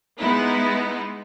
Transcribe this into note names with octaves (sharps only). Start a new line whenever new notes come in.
G#3 B3 D#4 E4